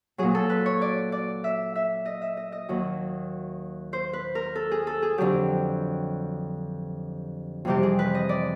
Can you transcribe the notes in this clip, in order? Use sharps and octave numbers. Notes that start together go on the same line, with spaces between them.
A#2 F#3 G#4
A4
B4
C#5
D5
D5
E5
E5
D#5
E5
D#5
D#5
D#2 D#3 F#3
C5
B4
A#4
A4
G#4
A4
G#4
F2 D3 F#3 G4
F2 C3 E3 G3 G4
G#4
B4
D#5
D5